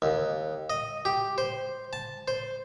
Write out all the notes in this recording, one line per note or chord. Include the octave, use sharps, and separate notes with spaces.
D#2
D#5
G4
C5
A5
C5